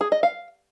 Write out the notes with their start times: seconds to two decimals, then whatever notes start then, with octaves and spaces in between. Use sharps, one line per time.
0.01 G#4
0.12 D#5
0.23 F5